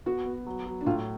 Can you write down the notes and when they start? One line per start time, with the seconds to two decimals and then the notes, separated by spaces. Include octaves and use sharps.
0.06 B3 F#4
0.26 B3
0.46 F#3
0.66 F#3
0.81 D4
0.86 A2 F4